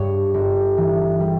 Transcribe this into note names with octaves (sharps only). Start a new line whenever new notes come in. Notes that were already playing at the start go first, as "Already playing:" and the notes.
Already playing: G2 C#5
G1
E3
G3